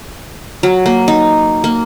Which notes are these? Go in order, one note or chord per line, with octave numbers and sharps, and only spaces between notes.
F#3
A#3
D#4
A#3